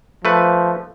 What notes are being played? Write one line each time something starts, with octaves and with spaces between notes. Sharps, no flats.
F3 A3 B4